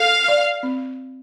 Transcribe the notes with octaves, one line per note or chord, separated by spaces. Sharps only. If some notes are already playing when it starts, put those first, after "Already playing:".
Already playing: A4 F5
D5
C4